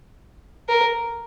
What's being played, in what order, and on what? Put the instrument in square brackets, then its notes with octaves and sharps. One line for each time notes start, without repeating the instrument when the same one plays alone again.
[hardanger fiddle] A#4